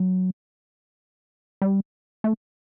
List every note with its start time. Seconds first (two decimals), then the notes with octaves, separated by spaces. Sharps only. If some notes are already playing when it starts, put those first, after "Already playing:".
Already playing: F#3
1.62 G3
2.24 A3